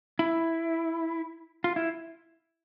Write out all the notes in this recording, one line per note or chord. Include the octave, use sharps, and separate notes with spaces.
E4
F4
E4